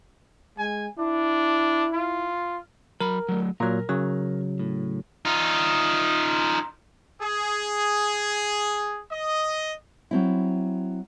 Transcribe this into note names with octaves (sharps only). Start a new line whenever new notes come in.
G#3 G#5
D4 E4
F4
F#3 A#4 B5
F#3 A3
A#2 F#3 A#4
C#3 F#3
A2
D#4 F4
G#4
D#5
F#3 C4 E4